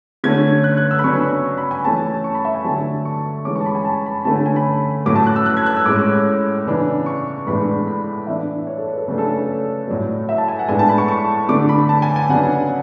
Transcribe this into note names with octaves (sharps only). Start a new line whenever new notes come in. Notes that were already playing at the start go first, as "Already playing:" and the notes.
D3 A3 C#4 G#6
F#6
F#6
E6
B5
C#3 F#3 B3 D4 C#6
C#6
B5
G#5
E3 A3 C#4 A5
C#6
B5
E5
G#5
D3 F#3 A3 D4 A5
C#6
E3 G#3 C#4 D6
C#6
A5
B5
G#5
A5
B5
D3 A3 C#4 A5
G#5
G#5
B5
A2 F#3 A3 C#4 D6
A5
F#6
E6
F#6
G#6
F#6
E6
A2 G#3 C#4 D6
C#3 E3 B3 D4
C#6
A2 E3 G#3 B3 D4 B5
B5
E3 B3 D4 E5
C#5
A4
B4
A4
C#3 F#3 A3 D4 B4
A4
B4
C#5
A2 F#3 A3 D5
E5
A5
G#5
F#5
A2 G#3 B3 D4 G#5
A5
B5
C#6
C#6
D3 A3 D4 D6
B5
A5
G#5
G#5
C#3 F#3 B3 D4 F#5